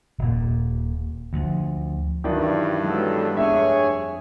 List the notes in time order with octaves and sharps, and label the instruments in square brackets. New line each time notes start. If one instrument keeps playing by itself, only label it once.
[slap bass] D#1 A#2
D2 F3
[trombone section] G2 [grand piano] D#3 E3 D4 [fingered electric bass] F#3
[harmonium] F#3 B3 A4 [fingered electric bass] G#3
[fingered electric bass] F2 A3 D4 [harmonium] G#4 C#5 G#5 [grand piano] E5